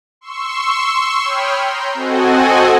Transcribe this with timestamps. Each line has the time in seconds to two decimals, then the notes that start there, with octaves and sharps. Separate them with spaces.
0.21 C6 C#6 E6
1.24 C#5 G5 B5 D#6 F6
1.64 A#5 C6 G6
1.94 C4 F#4 A4 D#5 F#5 G#5